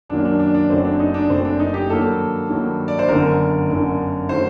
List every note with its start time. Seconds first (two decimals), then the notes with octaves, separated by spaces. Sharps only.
0.09 F#2 D#3 F#3 A#3 D4
0.25 D4
0.39 D4
0.54 D4
0.70 F#1 F#2 F#3 A3 C4
0.85 D4
1.00 D#4
1.14 D4
1.30 F#1 F#2 F#3 A3 C4
1.45 D4
1.59 D#4
1.74 G4
1.90 G2 D#3 F#3 A#3 A4
2.49 G2 D#3 F#3 A#3
2.88 D5
2.99 C5
3.09 G1 F#2 D3 A#4
3.68 G1 F#2 D3
4.29 D#3 F#3 A3 C5